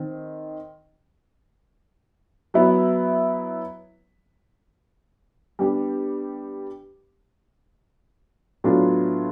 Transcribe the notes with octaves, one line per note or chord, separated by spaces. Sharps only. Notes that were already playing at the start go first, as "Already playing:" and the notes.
Already playing: D#3 C4
F#3 B3 E4
G3 B3 D4 G4
A2 F#3 B3 D4 F4